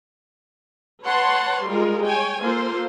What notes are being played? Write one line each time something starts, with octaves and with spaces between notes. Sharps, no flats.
B4 C#5 F#5 A5 C6
G3 G#3 F4 A#4
C#5 G5 G#5
A#3 F4 A4 C5